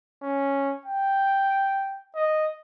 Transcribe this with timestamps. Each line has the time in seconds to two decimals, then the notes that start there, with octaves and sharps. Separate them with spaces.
0.22 C#4
0.85 G5
2.15 D#5